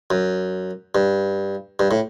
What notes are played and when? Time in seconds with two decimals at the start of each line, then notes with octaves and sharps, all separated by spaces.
0.10 F#2
0.95 G2
1.79 G2
1.91 A2